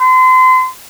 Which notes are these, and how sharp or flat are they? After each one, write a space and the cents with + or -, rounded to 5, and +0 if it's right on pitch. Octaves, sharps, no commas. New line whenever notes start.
C6 -35